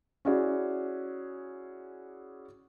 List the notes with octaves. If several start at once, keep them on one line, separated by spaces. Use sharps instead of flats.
C#4 E4 F#4 G#4 D5